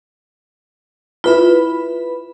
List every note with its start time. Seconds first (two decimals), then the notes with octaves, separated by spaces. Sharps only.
1.24 E4 F4 B4 B5